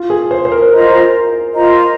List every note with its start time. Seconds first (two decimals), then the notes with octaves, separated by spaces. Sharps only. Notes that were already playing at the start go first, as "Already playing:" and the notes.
Already playing: F4
0.10 G#4
0.31 C5
0.45 C5
0.52 A#4
0.72 F4 C5 D#5 A#5
1.54 F4 C5 D#5 A#5